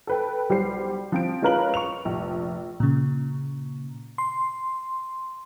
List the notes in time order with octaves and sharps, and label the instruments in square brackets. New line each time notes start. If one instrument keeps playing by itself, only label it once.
[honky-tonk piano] A4 B4 G5
B1 G3 G4 C5 C7
F3 C4 D7
G#3 C#4 F4 A#4 B4 F#7
C#6 F7
F1 A#1
[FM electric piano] A#2 C#3
C6